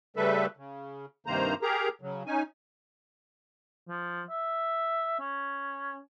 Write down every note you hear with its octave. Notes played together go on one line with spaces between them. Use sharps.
C#3 G3 A3 A4 B4 E5
C#3
G2 C3 D#3 A#3 C5 A#5
G4 G#4 A#4 A#5
C#3 F#3
C#4 D#4 G#5
F3
E5
C#4